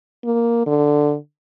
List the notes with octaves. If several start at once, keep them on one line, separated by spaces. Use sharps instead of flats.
A#3
D3